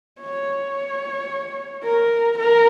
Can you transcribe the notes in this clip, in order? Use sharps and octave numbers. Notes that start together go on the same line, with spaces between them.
C#5
A#4
A#4